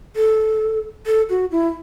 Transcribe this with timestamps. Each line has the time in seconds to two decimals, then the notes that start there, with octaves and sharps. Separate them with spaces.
0.16 A4
1.06 A4
1.30 F#4
1.51 E4